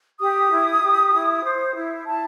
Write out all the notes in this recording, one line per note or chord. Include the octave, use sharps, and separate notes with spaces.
G4 D#6
E4
G4
E4
C5
E4
E4 A5